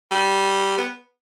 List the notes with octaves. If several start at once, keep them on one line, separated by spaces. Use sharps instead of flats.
G3
B3